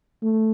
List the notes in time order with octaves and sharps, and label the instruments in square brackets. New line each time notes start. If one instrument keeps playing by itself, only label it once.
[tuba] A3